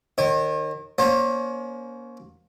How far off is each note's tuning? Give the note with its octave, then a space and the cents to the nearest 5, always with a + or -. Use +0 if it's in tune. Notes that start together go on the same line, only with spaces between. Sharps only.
D#3 -20 C#5 -45
A#3 +25 C#4 +30 C5 +40